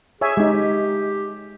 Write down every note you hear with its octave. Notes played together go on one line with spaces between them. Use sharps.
G#4 C#5 E5 G#5
G#3 D#4 G4